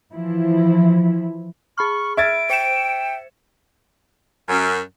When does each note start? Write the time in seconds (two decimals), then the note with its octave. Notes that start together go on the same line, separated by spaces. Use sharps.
0.13 E3 F3 E4
1.78 G#4 B5 C#6 F6
2.17 E5 G#6 A6 D7
2.50 C5 G5 C#7 E7
4.49 F#2